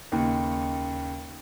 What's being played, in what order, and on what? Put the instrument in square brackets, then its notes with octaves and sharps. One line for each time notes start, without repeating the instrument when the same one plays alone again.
[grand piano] D#2 C#3